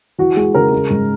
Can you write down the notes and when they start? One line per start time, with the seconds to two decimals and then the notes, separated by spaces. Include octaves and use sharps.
0.18 E3 F#4
0.36 G#3 G#4
0.55 C#3 A#4
0.72 G#3
0.90 G#2